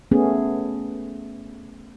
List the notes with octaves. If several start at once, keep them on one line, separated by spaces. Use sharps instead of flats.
A3 B3 C#4 G#4